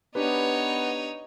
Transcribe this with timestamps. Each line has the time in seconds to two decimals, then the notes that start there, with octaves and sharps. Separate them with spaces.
0.15 B3 D4 D#4 G4 B4 C#5